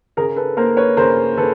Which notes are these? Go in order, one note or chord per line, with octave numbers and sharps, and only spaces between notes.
C#3 G#4 A#4
A4 B4
A#3 A#4 C5
B4 C#5
C#3 A#4 C5
C#3 A4 B4